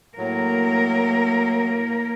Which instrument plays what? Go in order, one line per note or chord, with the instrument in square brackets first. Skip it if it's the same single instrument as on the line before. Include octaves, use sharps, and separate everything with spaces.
[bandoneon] A2 F#3 [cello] A#3 A#4